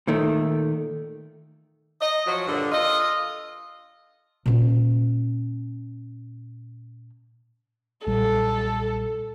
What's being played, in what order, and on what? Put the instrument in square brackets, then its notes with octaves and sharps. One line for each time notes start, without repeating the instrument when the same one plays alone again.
[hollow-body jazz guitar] A#2 D#3 A3
[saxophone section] D#5
F3 F#3
G2 A#2 D3
F4 A4 D#5
[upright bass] A#2 C#4
[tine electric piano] B1 A#2 G3 [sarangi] A4